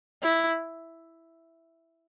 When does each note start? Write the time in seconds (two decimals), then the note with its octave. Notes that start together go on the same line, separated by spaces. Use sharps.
0.23 E4